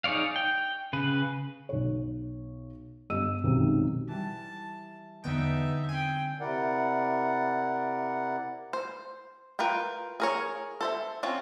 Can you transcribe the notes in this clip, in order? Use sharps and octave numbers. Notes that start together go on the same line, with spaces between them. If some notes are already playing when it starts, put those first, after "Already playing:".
D#4 G#4 C#5 D5 F5
G5
C#3 B4
B1 C#5
G2 B3 D#5 E6 D#7
B1 F#2 C3 D#3 G#3
E3 G3 A5
E2 D3 B3 D#4 E5 G5 A5 G6
C4 G5 G#5
C3 E4 A#4 D5 F#5
C5
F4 A#4 B4 G5
G#4 A#4 C#5
A4 C5 E5
C4 C#4 F4